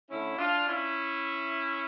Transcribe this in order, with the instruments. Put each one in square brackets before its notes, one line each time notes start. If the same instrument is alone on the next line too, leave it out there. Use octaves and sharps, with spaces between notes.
[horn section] D3 A3 C#4 E4
D4 F4
C#4 E4